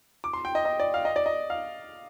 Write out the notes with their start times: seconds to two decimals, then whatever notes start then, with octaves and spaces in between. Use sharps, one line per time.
0.24 D6
0.33 C6
0.45 G5
0.55 D#5
0.65 D#5
0.80 D5
0.94 F5
1.05 D#5
1.16 D5
1.26 D#5
1.50 F5